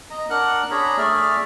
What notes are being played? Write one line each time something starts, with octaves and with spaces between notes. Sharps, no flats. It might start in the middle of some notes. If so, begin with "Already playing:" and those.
D#5 A#5
D4 A#4 F#5 F#6
D4 G#4 C#5 A#5 B5
A3 G#4 D5 E5 F6